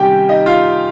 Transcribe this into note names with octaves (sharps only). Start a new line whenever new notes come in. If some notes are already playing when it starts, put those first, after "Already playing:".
Already playing: C3 D#3 G3 C#4 G4 G5 G#5
D#4 D#5
F4 F5